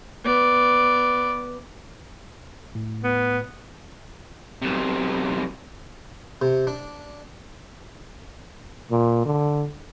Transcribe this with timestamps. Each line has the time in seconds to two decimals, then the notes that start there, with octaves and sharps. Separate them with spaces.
0.24 B3 D5
2.75 A2
3.04 B3
4.62 B1 C3
6.42 C3
6.67 D4
8.91 A#2
9.25 D3